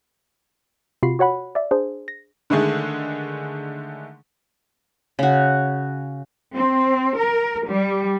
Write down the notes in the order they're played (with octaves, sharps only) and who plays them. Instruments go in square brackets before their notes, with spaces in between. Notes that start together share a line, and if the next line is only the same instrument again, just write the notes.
[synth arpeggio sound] C3 F4 F#4 B5 C7
F#4 C#5 F#5 B5
D5 E5
D4 G#4 C5
A#6
[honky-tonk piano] D3 D#3 G#3 A3 G#4
[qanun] C#3 F#4
[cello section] C4
A#4
G3